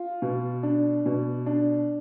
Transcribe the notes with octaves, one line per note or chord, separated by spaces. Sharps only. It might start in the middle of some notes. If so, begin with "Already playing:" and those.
Already playing: F4
B2
D4
B2
D4